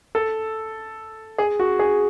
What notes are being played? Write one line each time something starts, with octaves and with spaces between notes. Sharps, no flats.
A4
G#4
F#4
G#4